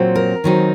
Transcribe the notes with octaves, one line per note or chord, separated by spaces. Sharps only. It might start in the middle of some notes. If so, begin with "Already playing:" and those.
Already playing: A#2 F#3 C4
A#4
D#3 F#3 C4 D#4